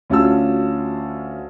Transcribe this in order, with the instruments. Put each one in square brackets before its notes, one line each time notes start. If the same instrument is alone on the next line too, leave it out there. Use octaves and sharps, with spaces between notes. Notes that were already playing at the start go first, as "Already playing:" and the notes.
[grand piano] D2 C#4 F4 F#4 A5 E6